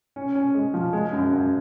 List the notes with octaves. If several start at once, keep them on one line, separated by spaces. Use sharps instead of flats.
C#4
C#4
G#3
F3
G#3
F#2
F#2